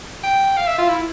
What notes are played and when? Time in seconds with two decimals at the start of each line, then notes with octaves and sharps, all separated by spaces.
0.23 G5
0.57 F5
0.67 E5
0.78 F4
0.89 E4